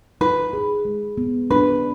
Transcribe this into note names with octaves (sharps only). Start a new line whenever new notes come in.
D#4 B4
G#4
G#3
B3
D4 B4